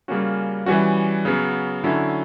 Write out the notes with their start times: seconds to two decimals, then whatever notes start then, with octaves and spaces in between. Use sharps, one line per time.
0.08 C#3 G3 A#3 C#4 F#4
0.66 E3 G3 C#4 F#4
1.25 C#3 F#3 B3
1.84 D3 F#3 C#4 E4